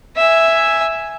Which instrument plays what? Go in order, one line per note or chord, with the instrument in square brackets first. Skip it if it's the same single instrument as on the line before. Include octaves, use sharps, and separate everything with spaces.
[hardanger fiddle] E5 G#5